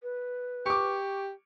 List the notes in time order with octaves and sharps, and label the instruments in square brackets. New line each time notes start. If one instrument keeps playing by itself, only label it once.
[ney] B4
[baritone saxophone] G4 [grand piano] C#6 D6